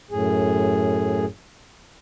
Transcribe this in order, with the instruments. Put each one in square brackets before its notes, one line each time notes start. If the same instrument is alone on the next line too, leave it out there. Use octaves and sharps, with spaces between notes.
[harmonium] F#2 A2 G#4